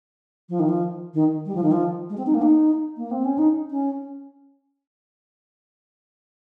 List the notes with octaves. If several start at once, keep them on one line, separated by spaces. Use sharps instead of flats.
F3
D#3
F3
D#3
G3
F3
D#3
F3
G#3
C4
D#4
A#3
D#4
A#3
C4
C#4
D#4
C#4